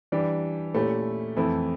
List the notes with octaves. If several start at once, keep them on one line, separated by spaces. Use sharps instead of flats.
E3 G3 D4 G4
A#2 A3 C#4 E4 G4
F2 E3 A3 E4